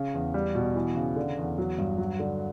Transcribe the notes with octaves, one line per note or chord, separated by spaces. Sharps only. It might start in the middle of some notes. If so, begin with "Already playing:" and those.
Already playing: C#3
E2
G3
B2
E3
C#3
D3
E2
F#3
G2
F#3
D3